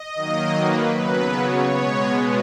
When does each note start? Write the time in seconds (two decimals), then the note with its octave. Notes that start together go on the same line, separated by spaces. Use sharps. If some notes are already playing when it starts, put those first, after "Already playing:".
Already playing: D#5
0.15 D#3 F#3 A#3
0.56 B4
0.95 C#3 F#3 B3 B4
1.35 C#5
1.75 B2 G#3 B3